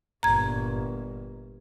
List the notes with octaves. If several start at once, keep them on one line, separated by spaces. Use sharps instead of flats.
G1 A#2 A#5 G#6